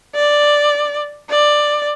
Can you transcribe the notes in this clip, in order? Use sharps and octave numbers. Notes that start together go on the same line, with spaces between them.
D5
D5